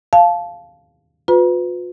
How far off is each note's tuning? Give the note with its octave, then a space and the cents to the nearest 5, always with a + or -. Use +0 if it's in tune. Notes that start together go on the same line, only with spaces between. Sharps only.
F5 +0 A5 -20
F4 +45 B4 +20 A#5 +40